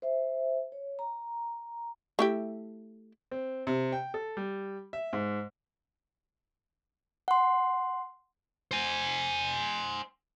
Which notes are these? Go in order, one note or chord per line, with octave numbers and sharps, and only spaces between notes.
C5 E5
C#5
A#5
A3 E4 G4
C4
C3
G5
A4
G3
E5
G#2
F#5 C6
C5 G#5